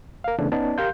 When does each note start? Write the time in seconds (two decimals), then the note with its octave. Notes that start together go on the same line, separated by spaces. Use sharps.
0.24 A#4 F5
0.39 C#3 E3 A3 B3 D4
0.52 B3 C#4 D#4 D5 A5
0.78 G4 A#4 F5 C6 G6